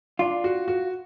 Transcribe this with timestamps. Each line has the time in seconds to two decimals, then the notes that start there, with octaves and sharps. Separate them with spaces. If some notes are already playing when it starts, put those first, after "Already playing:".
0.19 D4 F4
0.44 F#4
0.68 F#4